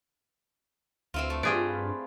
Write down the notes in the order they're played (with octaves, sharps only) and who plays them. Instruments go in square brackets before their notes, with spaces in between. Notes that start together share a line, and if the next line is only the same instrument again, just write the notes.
[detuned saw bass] D2 [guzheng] C4 E4 F4
[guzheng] A3
[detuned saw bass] G2 [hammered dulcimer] F4 B4 [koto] G4 G#4 D5